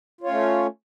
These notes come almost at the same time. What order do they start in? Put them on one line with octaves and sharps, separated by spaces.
F4 C#5 C#4 A3